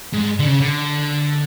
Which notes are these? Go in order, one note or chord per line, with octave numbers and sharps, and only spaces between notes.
G#2
D3
C#3
D3